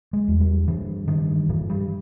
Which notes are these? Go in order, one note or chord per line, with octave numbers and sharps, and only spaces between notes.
G#3
E2
G3
G2 E3
G2 D#3
G2 E3
G3